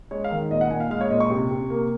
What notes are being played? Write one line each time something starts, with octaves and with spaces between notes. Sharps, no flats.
G#3 C#5
F5
D#3
A#2 D#5
F#5
A#2 G#5
F5
G#3 F5
C#5
A#2 D#5
C#6
C3
C3
A#3